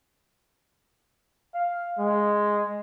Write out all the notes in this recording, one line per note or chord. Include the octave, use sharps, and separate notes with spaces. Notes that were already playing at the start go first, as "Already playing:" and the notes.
F5
G#3